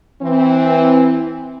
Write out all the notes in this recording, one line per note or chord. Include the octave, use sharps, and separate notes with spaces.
E3 C4